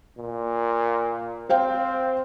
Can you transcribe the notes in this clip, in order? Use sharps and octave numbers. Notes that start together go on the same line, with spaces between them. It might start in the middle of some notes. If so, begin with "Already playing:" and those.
A#2
C4 C5 F5 G5